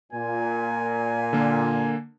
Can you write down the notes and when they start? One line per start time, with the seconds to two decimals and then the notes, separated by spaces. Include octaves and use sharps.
0.12 A#2 G#5
1.33 D3 A#3